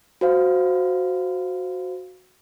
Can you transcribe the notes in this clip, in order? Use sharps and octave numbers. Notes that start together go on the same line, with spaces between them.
F#4 C5 F5